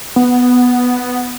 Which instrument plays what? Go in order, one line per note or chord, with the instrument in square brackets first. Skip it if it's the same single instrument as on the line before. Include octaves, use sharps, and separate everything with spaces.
[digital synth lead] B3